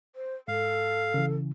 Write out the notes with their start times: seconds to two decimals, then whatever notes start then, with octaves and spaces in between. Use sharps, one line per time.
0.16 C5
0.48 G#2 A4 F5
1.14 C#3 E3